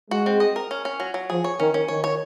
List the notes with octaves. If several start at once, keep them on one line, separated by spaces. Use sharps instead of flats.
G#3 F#4
C4
D#5
A#4
C#4
C#4
F#3
F#3
F3 G#4
C#5
D#3 C#4
C#4
D#3 C#5
C#5